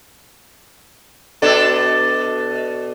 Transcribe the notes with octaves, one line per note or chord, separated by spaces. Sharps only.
B2 D4 A4